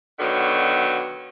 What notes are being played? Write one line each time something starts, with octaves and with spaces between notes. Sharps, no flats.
B2 D3 D#3 F#3